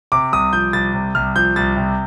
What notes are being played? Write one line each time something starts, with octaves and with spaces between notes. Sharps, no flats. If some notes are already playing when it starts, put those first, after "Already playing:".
C3 D6
C2 D#6
F3 G6
C2 A6
C3
C2 F6
F3 G6
C2 A6
C3